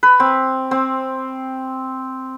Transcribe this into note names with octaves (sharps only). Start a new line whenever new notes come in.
B4
C4
C4